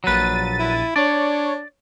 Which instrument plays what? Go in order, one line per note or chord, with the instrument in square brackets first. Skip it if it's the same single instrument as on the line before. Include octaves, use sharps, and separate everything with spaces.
[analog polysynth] A#1 A6 D#7 [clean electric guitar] F#3 B4
[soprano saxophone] E4
[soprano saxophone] D4 [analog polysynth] C#5 [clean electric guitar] D5